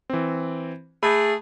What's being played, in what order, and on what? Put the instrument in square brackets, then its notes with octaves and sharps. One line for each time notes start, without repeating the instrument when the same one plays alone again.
[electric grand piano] E3 C4
[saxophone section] A3 G#4 [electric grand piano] B5